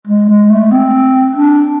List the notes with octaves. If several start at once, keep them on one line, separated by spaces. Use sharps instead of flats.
G#3
G#3
A3
C4
D4